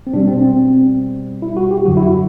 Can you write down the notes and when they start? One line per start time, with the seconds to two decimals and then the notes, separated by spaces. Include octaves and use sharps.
0.07 C4
0.14 B2 G3 D4
0.27 C4
0.42 C4
1.42 E4
1.57 F#4
1.71 G4
1.85 F#2 D3 F#3 F#4
1.97 E4
2.06 F#4